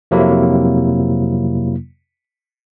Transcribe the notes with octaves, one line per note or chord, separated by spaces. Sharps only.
F2 C3 F#3 A#3 E4